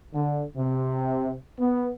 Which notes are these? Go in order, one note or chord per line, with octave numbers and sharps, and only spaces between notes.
D3
C3
B3